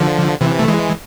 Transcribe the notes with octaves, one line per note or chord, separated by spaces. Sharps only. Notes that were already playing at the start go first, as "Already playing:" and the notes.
Already playing: D3 F3
C3 E3
A3
E3 G#3